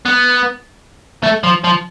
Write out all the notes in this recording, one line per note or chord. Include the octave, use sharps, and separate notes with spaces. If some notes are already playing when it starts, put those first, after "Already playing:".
B3
A3
F3
F3